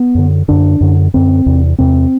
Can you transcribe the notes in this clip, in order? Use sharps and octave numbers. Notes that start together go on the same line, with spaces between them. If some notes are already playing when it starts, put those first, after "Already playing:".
Already playing: B3
F#2 D3
F#2 D3 D4
F#2 D3
F#2 D3 C4
E2 C3
E2 C3 C4